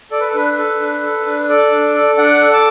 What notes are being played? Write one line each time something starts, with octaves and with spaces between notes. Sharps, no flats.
A4 D5
B4
A4
D4 B4
A4
D4
A4
D4
A4 D5
D4
A4
D4 D5 F#5
A4
A5 D6